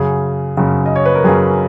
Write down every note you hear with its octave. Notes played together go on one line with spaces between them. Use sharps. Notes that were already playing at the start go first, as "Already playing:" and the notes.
Already playing: F#2 C#3 G#4
F#2 C#3
D#5
C#5
B4
A#4
F#2 C#3 G#4